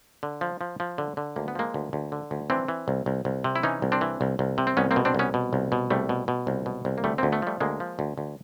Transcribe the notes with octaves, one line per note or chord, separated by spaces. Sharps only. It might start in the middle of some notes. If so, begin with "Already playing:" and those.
D3
F3
F3
F3
D3
D3
D2 A#3
B3
F3 G#3 A#3
D2
D2
D3
D2
E3 C4 D4
E3
C2
C2
C2
C3
E4
E3 C#4 D#4
C2
C4 D4
E3
C2
C2
C3
C4
C2 B3 C#4
A#3 C4
B2
C4 D4
C2 B3 C#4
B2
C2
B2
C2 G3 A3
B2
B2
C2
B2
C2
A#3
D2 G3 A3
D2 A#3 C4
A3 B3
F3 G3 A3
D2 G#3 A#3
F3
D2
D2